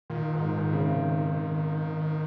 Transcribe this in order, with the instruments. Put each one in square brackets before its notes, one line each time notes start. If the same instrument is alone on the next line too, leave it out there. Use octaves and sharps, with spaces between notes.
[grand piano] A#2 [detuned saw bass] D#3
[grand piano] G#2
G#2
C#3
C3